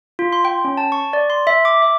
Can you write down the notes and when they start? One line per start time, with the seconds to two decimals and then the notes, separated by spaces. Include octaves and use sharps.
0.19 F4
0.33 C6
0.45 G5
0.65 C#4
0.77 A5
0.92 C#6
1.13 D5
1.30 C6
1.47 E5
1.65 D6
1.82 E5